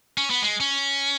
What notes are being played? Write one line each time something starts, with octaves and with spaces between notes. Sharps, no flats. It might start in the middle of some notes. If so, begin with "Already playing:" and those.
C#4
B3
G#3
C#4